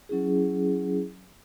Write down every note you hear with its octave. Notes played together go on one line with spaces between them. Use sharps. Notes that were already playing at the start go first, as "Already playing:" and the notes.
F#3 C#4 E4 G#4